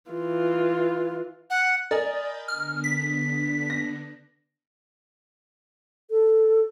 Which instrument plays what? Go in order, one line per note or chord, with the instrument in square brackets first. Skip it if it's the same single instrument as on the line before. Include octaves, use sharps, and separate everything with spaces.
[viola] E3 F4
[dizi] F#5
[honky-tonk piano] A#4 D#5 G#5 [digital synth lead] D5 [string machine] B5 G6 A6
[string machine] D3 B3 D4 [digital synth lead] F6
[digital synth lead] B6
[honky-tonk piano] A#6
[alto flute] A4